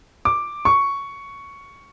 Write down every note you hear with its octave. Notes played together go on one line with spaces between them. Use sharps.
D6
C#6